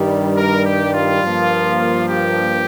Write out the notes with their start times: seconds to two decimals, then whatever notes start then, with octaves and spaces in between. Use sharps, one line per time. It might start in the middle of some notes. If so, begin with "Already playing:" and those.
Already playing: G2 D#3 G3
0.37 A#4
0.65 G4
0.93 F4
1.22 G2 F3 A#3
2.08 G4